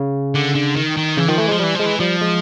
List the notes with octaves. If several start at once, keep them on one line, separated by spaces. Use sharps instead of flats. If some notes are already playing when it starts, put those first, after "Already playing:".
Already playing: C#3
D3
D3
D#3
D#3
C#3 E3
D#3 F3
E3 A3
G#3
F3
E3 G3
F3 G#3
E3
F3 G3
G#3